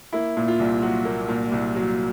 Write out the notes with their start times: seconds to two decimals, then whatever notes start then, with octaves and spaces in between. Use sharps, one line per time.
0.13 A#3 E4
0.37 A#2
0.48 F4
0.59 C2
0.82 F#3 F#4
1.05 A#3
1.28 A#2
1.52 C2
1.76 F#3